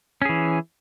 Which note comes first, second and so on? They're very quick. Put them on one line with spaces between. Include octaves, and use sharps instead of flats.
C#4 G#4 E3